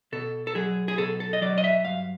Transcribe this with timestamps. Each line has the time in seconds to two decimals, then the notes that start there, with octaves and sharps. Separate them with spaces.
0.12 B2 A4
0.47 A4
0.55 F#3 G#4
0.88 G#4
0.98 B2 A4
1.20 A4
1.33 D#5
1.42 F#3 D5
1.58 D#5
1.64 E5
1.85 G2 F5